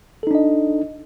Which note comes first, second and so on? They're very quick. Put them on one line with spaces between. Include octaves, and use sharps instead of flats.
A4 D#4 D4 D#5